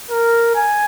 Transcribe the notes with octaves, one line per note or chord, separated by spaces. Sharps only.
A#4
G#5